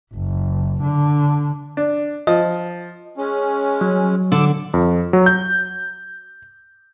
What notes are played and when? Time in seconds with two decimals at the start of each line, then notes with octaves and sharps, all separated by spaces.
0.14 F#1
0.83 D3
1.77 D4
2.27 F3 D#5
3.17 G#3 C#4
3.81 F#3
4.32 D3 D6 E6
4.74 F2
5.13 F#3
5.26 G6